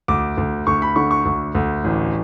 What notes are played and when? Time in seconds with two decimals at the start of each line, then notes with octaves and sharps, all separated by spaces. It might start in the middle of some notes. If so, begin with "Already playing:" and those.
0.08 D2 D6
0.37 D2
0.67 D2 C#6
0.82 B5
0.96 D3 C#6
1.11 C#6
1.25 D2
1.55 D2
1.84 A1